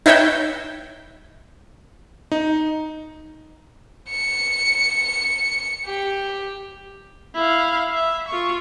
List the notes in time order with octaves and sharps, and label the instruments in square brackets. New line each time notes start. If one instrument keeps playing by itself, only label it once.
[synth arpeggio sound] D#4 E4 B4 C#5 E5 G5
[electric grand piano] D#4
[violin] C#7
G4
[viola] E4 F5
E5
F4 C#6